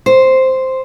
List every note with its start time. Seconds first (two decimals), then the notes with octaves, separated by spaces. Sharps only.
0.06 C5